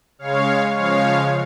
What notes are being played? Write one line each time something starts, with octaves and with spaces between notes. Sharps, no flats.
C#3 G#3 C#5 F5
C#3 F3 G#3 C#5 F5